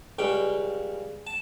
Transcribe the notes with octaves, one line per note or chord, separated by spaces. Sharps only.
C#2 C#3 G3 G5
A5